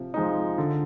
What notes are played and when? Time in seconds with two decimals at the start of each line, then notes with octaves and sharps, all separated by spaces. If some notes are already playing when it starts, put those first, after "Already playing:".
Already playing: C3 F3
0.14 F3 G#3 D#4
0.58 D3